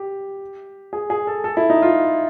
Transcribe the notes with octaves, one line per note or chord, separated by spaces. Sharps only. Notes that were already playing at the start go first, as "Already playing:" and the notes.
Already playing: G4
G#4
G#4
A4
A4
E4
D#4
F4